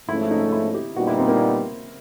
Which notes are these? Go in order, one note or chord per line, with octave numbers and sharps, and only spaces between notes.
G#2 F3 A3 C#4 E4
D#4
E4
G4
A#2 G3 B3 D#4 F#4
E4
C4
A#3